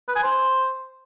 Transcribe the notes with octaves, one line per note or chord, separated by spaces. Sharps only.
B4
G#5
C5